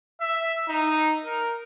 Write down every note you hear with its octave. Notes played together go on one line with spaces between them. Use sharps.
E5
D#4
A#4